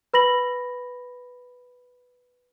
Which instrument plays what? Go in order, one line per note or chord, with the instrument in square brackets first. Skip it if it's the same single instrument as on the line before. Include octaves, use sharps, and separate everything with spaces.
[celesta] B4 B5 A#6 F#7